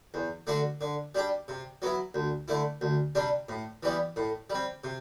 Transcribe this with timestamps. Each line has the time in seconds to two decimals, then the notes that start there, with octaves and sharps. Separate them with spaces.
0.14 E2
0.47 D3 A3 D4 F#4
0.81 D3
1.15 G3 D4 G4
1.48 C3
1.82 F#3 B3 E4
2.14 D2
2.48 D3 A3 E4
2.81 D2
3.15 C3 G3 D4
3.49 A2
3.83 E3 G3 B3
4.16 A2
4.50 G3 C4
4.84 C3